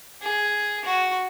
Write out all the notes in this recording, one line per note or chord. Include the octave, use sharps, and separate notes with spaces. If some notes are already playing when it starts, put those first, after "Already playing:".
G#4
F#4